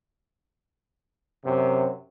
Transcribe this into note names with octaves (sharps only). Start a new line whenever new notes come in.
F#2 C3